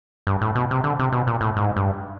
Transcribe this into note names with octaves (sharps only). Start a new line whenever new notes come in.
G2
A2
B2
C3
D3
C3
B2
A#2
A2
G#2
G2